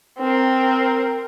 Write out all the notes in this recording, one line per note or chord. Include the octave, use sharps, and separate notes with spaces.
C4 A#4